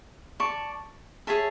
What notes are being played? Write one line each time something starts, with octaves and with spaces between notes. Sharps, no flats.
D5 A5 C#6
G#4 C#5 E5 A5